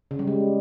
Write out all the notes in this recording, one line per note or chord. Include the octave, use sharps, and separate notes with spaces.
C#3
G3
G#3